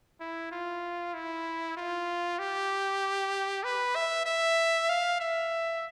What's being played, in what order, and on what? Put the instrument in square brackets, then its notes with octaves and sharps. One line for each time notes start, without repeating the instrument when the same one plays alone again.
[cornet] E4
F4
E4
F4
G4
B4
E5
E5
F5
E5